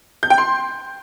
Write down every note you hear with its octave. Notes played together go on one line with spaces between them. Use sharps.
G6
G5
C6